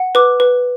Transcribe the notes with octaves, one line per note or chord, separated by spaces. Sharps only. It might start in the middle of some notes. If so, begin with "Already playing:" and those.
Already playing: F#5
B4 D6
B4